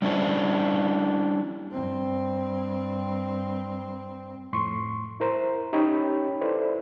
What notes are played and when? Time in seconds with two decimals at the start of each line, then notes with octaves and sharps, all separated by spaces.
0.02 G3 C#4 D4 E4 C5
1.72 G2 C4
4.53 F2 A2 C6 C#6
5.20 E4 A#4 C5 A#5
5.73 C#4 D#4 G4 C#5 G5 B5
6.41 E4 A4 B4 C5 D5